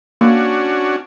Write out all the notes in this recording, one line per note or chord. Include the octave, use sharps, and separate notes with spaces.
A#3 C#4 D4 F#4